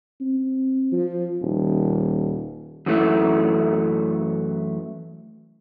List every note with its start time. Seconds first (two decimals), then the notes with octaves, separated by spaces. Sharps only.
0.21 C4
0.92 F3
1.42 D#1
2.86 F#2 E3 A3